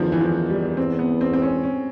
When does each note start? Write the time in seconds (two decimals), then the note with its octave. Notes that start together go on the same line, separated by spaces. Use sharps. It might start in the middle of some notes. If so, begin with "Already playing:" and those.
Already playing: E2 D3 D#3 F3
0.12 E3
0.21 F3
0.50 G3
0.77 E2 C4
0.99 B3
1.21 C4
1.33 C4
1.42 C#4
1.63 C#4